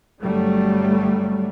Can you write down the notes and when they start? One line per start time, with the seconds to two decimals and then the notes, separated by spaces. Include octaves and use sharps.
0.21 G1 F#3 G3 A3